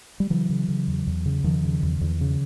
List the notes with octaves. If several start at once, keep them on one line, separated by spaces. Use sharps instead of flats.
G3
C#3 E3 F#3
C#3
C#3
E2
E2
C#3
E2 D#3 F3
C#3
E2
E2
C#3